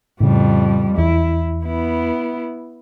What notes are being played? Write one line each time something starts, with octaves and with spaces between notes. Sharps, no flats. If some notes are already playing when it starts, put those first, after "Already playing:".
F2 A2 C#3 G3
E2 E4
B3 E4